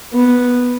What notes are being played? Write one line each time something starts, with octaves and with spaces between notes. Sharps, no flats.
B3